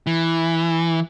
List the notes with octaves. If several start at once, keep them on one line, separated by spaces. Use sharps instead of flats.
E3